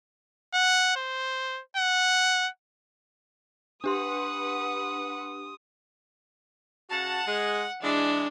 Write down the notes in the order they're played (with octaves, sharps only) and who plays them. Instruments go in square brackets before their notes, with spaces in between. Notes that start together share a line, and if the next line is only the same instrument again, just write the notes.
[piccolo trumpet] F#5
C5
F#5
[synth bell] D4 G4 C6 [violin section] B4 F#5 [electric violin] D#6
[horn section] C#3 F#4 A5 [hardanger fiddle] F#5
[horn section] G#3
[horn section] E3 G#3 [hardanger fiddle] D4